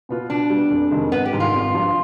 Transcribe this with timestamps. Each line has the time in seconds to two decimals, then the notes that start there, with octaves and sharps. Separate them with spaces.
0.09 B2 B3 F4
0.30 B2 D4
0.50 G3 B3
0.71 F1
0.91 F2 C3 D#3 G#3
1.12 G#1 B3
1.25 G4
1.33 G#2 D#3 G3
1.40 F4
1.54 G#1
1.74 G2 F3